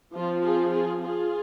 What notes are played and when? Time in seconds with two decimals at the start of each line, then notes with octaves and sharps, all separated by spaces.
0.14 F3 C4 F4
0.43 F4 G#4
0.72 F4 G#4
1.02 F4 G#4